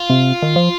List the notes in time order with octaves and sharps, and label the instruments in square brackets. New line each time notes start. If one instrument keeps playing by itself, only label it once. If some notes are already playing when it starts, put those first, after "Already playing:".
Already playing: [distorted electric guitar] F4
[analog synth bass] C3
D#3
F3